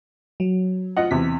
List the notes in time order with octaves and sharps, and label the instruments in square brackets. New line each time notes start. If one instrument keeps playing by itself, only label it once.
[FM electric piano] F#3
[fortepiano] F4 D#5 F#5
[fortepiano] E2 C3 [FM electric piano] B6